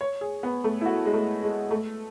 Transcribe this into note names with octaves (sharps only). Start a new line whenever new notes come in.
C#5
G#4
B3
A3
E4
F#4
G#3
A3
G#3
A3